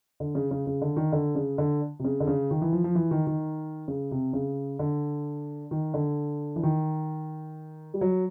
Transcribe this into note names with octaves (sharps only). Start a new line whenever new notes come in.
D3
C#3
C#3
C#3
D3
D#3
D3
C#3
D3
C3
C#3
D3
C#3
D#3
E3
F3
F3
E3
D#3
D#3
C#3
C3
C#3
D3
D#3
D3
E3
D#3
G3
F#3